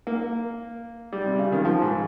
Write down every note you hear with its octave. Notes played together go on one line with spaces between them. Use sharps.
A#3
G3
C3
C#3
D#3
F3
G#2